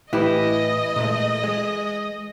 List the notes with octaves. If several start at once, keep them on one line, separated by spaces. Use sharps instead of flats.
A2 E3 E4 G4 B4 D#5
A#2 G#3 A3
G#3